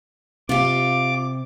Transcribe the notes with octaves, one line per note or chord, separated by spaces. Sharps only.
C3 F4 G4 D6